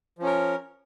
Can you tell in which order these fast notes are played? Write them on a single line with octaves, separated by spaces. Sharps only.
F3 C#4 A#4